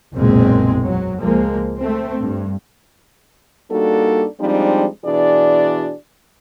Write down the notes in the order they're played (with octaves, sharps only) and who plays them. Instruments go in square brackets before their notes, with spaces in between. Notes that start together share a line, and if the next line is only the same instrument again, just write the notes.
[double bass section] F#1 B1 E2 A#2 G#3 C4
F#3
C#2 F3 G#3 A#3
A3 C4
G2
[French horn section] G3 A#3 D4 D#4 F#4 A4
F3 G3 G#3 C4 D4 D#4
B2 E3 D4 F#4 G#4 D5